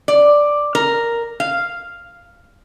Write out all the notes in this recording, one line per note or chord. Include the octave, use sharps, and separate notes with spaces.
D5
A#4
F5